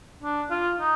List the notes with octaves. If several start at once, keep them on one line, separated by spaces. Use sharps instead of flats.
D4
F4
D#4